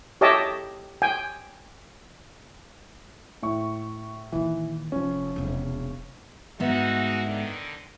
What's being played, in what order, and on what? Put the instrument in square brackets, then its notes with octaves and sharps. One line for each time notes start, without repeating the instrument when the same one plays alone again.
[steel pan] G4 C#5 D#5 E5 A5 D6
G5 G#5
[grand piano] A2 C#6
[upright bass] A#2 D#3 [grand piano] E3
[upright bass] F1 [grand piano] F3 C#4
[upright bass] E1 C3
[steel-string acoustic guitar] G#2 B3 E5 [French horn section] G#3 D#4 F#4
[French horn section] D3 D#3